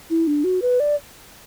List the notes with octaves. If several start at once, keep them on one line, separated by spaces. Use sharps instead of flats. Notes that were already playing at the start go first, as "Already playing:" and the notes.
E4
D4
F#4
B4
D5